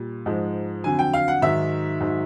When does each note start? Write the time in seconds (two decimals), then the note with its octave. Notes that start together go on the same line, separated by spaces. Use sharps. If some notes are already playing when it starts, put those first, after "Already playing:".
Already playing: A#2 G3
0.26 G#2 F3 G#3
0.84 F2 D3 F#3 G#5
0.99 G5
1.14 F5
1.28 F#5
1.42 G#2 D#3 F#3 E5
2.00 G#2 D#3 F#3